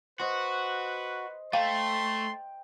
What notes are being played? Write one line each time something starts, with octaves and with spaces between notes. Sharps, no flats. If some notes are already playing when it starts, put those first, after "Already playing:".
F#4 B4 C5 D#5
A3 F5 G5 C6